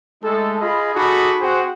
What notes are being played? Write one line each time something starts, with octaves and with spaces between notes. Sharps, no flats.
G#3 A3 D#4 A4
F4 G#4 D#5 B5
D#4 F#4 G#4 A4 B5 D6
C4 F#4 G#4 C5 F#5 G5